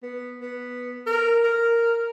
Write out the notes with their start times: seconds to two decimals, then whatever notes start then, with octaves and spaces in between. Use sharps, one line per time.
0.03 B3
0.41 B3
1.06 A#4
1.44 A#4